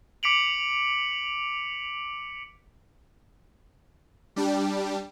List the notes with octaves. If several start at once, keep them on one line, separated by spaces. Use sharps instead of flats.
D6 B6 C#7 D7 F7 F#7
G3 D4 G4